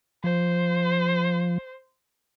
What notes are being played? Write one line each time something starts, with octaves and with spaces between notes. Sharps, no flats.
F3 C5